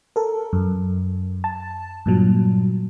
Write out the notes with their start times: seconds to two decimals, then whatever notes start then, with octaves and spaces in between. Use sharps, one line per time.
0.16 A4 A#4
0.53 F#2
1.44 A5
2.06 G2 A#2 F#3